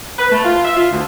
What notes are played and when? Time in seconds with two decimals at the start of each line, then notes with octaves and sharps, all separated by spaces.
0.18 B4
0.31 A3
0.45 F4
0.65 E5
0.77 F4
0.91 D2